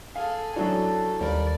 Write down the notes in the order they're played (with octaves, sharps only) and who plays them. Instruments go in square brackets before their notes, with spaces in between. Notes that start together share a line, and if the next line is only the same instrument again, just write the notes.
[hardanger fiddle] G#4 A4 [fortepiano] F5
[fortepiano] F#2 F#3 D4 [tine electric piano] E4 F#4 [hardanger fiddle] A4
[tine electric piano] D#2 [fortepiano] G3 A#4 [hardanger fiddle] D5